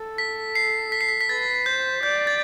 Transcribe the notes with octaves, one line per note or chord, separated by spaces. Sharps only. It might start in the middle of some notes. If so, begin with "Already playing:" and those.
Already playing: A4
B6
C7
B6
C7
B6
B6
B4 A6
C5 G6
D5 G6
A6